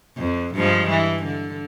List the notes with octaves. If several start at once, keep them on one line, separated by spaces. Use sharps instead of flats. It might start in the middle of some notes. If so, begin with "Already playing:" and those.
F2
G2 F3 G#3
E3
D3